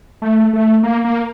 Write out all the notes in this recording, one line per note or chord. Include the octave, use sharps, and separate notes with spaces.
A3
A3
A#3
A#3